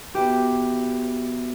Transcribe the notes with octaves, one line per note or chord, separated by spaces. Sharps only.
B3 F#4 G4 B4 E5